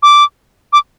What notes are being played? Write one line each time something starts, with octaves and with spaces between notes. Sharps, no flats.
D6
D6